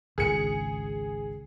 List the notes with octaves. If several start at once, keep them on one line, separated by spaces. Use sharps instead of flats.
G#1 C#2 G#4 C#7